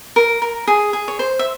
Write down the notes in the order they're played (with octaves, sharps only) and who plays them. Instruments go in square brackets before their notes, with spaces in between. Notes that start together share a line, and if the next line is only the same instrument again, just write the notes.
[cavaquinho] A#4
A#4
G#4
G#4
C#5
C5
E5